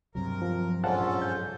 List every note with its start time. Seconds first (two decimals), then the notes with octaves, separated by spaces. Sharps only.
0.15 G2 C3 F#3 A#4
0.42 F3
0.84 A#1 G#2 C#4 F4 A4 F5 F#5 A5
1.22 G6